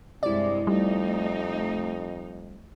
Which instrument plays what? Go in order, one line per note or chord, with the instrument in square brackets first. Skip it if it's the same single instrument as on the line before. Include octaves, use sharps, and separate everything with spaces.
[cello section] G2 G#3 [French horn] C3 [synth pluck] E4 D5
[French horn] F2 [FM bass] G3 [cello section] A3 D#4